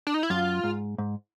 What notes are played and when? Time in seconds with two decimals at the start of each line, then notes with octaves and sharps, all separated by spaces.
0.07 D4
0.14 D#4
0.23 E4
0.30 F#2 F4
0.64 G#2
0.98 G#2